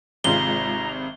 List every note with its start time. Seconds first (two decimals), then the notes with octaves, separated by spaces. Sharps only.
0.24 G#1 C3 G#3 F4 A#5 G7